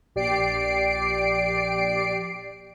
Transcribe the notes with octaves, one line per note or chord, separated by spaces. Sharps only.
A#1 G4 D5 C7 D7